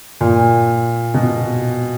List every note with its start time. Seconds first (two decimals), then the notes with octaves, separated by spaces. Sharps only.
0.21 A#2
1.14 B2